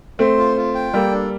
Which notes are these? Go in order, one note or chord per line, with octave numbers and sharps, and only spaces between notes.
A3 C4 C5
F4
F4
G5
G3 A#3 A4
D4